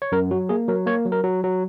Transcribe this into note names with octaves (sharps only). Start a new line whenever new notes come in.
C#5
F#2 A#4
F#3 F#4
A#3 G#4
F#3 A#4
A#3 C#5
F#3
A#4
F#3
F#3